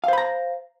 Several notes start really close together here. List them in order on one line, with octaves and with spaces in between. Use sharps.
F5 C5 B5 A#5